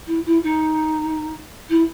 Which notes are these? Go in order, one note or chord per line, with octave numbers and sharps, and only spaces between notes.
E4
E4
D#4
E4